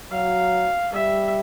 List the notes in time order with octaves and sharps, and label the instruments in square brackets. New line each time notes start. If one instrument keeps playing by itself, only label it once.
[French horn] F#3 [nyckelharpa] F5
[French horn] G3 [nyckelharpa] E5